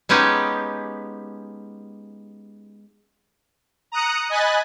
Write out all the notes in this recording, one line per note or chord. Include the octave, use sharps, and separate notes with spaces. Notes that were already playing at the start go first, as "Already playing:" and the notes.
G#3 B3 C#4 D#4 G4
A#5 D#6 F#6 C#7
D#5 G#5 B5 F#6 A6